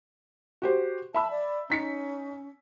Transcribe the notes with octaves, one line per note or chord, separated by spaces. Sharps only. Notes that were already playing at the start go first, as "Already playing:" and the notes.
F#4 G4 C5
E5 A5 B5 E6
D5
C#4 D#4 B6 C#7